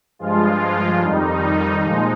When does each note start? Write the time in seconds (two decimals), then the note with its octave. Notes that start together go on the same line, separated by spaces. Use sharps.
0.19 G2 F3 G#3 F4
1.01 F2 D#3 G3 D#4
1.84 A#2 F3 G#3